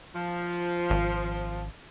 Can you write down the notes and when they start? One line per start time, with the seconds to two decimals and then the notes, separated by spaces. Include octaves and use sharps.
0.15 F3
0.90 G#1